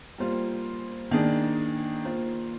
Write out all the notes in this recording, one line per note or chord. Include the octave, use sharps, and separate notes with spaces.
G3 A#3 F4 C5
D#3 A#3 D4 G#4
A#3 F4 C5